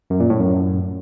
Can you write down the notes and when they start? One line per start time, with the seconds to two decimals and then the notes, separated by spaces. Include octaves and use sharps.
0.10 F#2
0.20 A#2
0.30 A2
0.39 F#2